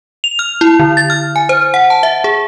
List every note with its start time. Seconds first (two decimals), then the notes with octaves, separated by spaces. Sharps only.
0.24 F7
0.39 F6
0.61 E4
0.79 D3
0.97 A6
1.10 F6
1.36 G#5
1.49 C5
1.74 F#5
1.90 A5
2.03 E5
2.24 G#4